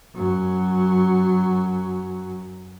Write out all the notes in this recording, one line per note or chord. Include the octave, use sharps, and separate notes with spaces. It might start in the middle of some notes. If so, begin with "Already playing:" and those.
F#2 F#3